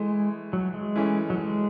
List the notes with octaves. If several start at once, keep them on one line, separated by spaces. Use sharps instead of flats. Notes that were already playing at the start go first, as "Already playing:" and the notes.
Already playing: E3 G#3 A3
F#3
G#3
E3 A3 C#4
F#3
G#3